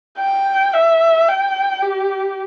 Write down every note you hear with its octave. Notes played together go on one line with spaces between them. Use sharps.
G5
E5
G5
G4